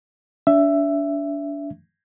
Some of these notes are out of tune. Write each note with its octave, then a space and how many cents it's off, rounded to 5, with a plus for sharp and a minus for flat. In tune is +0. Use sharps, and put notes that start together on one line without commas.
D4 -30 E5 +10